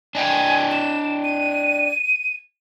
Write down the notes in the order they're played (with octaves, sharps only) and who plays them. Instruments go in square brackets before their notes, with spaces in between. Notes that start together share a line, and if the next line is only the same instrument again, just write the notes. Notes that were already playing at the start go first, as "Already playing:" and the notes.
[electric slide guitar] D4 D#5 G5 [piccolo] G#5
[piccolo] E7
D#7